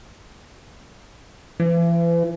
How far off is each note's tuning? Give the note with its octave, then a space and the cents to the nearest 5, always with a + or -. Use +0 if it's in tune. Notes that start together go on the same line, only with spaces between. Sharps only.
E3 +40